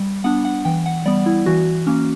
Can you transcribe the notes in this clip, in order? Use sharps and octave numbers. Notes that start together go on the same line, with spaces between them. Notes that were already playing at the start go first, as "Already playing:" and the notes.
Already playing: G3
B3 D4 F#5
F#5
E3 G5
F#5
G3 B3 D5
E4
E3 F#4
A#3 C#4